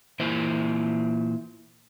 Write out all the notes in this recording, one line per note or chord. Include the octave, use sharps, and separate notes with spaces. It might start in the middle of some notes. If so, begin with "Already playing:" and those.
A#2 E3 E4 C5 E5